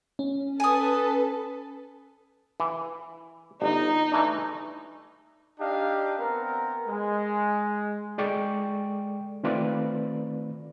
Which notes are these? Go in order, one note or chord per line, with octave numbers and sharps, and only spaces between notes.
C#4
A4 B4 G#5 D#6
E3
G1 D#4
E3 A3 D4
D4 D#4 G4 D#5 F5
B3 C4 A#4
G#3
G#3 A4 D5 G5 C#6 D6
D#3 A3 C4 F4 B4 D5